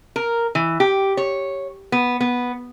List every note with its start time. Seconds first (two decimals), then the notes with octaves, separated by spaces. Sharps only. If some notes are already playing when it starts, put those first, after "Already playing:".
0.16 A#4
0.55 E3
0.80 G4
1.17 C#5
1.92 B3
2.21 B3